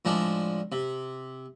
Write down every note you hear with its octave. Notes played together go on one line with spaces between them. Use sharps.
A2 F3 G#3 D4
C3